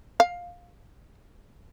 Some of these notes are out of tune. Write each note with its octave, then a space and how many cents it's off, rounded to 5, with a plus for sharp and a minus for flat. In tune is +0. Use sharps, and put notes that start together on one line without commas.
F5 +15